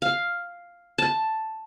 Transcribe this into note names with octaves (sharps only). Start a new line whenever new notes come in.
F5
A5